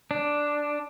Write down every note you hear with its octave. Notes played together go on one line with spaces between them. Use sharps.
D4